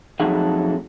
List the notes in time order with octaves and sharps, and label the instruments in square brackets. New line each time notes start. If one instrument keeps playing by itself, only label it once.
[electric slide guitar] F2 F#3 A3 D#4 G#4 F#5